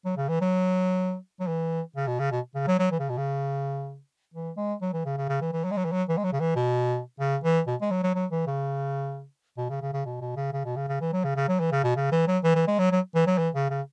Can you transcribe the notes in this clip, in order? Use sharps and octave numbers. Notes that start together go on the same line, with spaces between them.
F#3
C#3
E3
F#3
F#3
E3
C#3
B2
C#3
B2
C#3
F#3
F#3
E3
C#3
B2
C#3
E3
G#3
F#3
E3
C#3
C#3
C#3
E3
E3
F#3
G#3
F#3
E3
F#3
E3
G#3
F#3
C#3
E3
B2
C#3
E3
B2
G#3
F#3
F#3
F#3
E3
C#3
B2
C#3
C#3
C#3
B2
B2
C#3
C#3
B2
C#3
C#3
E3
F#3
C#3
C#3
F#3
E3
C#3
B2
C#3
E3
F#3
E3
E3
G#3
F#3
F#3
E3
F#3
E3
C#3
C#3